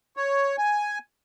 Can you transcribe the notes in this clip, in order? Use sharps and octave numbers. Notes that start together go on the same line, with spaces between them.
C#5
G#5